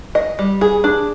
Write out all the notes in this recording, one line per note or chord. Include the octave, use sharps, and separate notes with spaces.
D#5
G3
G#4
D4